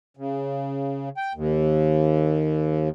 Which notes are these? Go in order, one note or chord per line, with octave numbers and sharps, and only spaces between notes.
C#3
G5
D#2